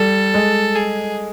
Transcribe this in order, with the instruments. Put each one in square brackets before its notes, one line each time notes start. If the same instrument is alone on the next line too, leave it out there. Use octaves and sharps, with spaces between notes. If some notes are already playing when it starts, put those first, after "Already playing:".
Already playing: [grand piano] G3 [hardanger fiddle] A4
[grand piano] G#3
[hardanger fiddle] G#4